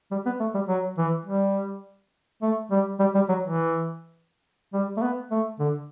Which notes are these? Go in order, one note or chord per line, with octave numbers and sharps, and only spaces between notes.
G3
B3
A3
G3
F#3
E3
G3
A3
G3
G3
G3
F#3
E3
G3
A3
B3
A3
D3